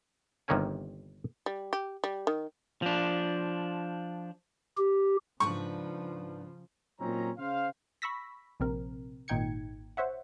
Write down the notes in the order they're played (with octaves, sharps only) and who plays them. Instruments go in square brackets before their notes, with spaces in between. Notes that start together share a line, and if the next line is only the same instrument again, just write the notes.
[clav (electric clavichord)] G1 C3 D#3 A#3 C#4 G#5
[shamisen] G3
G4
G3
D#3
[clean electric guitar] F3 D4
[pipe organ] G4
[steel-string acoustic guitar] G#2 D4 B4 [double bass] C#3 F3 [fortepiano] C#6
[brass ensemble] A#2 F#3 C4 C#4 D#4 A#5
C#3 C5 F5
[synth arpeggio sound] B5 C#6 E6 A#6 B6
A#1 C3 C4 A#4
G#1 A#2 D#4 G5 G#6 C#7
C5 C#5 E5 F#5